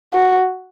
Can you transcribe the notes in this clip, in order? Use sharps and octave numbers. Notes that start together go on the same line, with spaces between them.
F#4